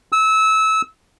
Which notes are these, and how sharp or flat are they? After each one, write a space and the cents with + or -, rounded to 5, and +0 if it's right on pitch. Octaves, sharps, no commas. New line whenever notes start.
E6 -25